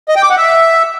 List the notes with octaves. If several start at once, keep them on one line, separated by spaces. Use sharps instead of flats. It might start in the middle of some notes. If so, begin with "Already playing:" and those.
D#5
G5
D6
F#5
E5